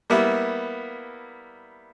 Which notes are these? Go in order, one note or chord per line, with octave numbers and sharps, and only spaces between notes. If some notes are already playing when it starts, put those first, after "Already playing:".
G3 A#3 B3 E4